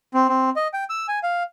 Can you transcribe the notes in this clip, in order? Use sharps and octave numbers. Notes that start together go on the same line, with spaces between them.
C4
C4
D#5
G5
E6
G#5
F5